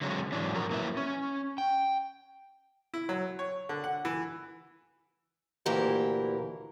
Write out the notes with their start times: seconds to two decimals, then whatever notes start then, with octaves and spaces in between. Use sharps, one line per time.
0.01 D3 F#3 G#3 C4 C#4
0.32 G#2 E3 F#3 C#4 D4
0.54 F3 F#3 A#4
0.71 F#3 A#3 D4 E4 B4 E5
0.97 C#4
1.58 G5
2.94 E4
3.09 F#3
3.39 C#5
3.69 D3
3.84 F#5
4.05 E3
5.66 D2 A#2 E3 G4 A#4